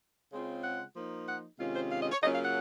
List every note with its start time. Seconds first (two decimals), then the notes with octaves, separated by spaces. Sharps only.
0.32 C#3 G#3 C4 F4
0.63 F#5
0.95 F3 A#3 D#4
1.27 F#5
1.59 C3 D#3 G#3 C#4 F4 F5
1.75 C5
1.91 F5
2.01 D#5
2.12 C#5
2.22 C#3 F#3 A#3 C#4 F4 D#5
2.33 F5
2.44 F#5